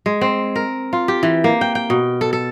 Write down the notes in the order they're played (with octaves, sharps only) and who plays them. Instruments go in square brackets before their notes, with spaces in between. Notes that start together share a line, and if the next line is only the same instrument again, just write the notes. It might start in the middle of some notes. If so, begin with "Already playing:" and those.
[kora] G#3
C4
A#4
F4
G4
E3
A#3
G5
G5
B2
A4
A4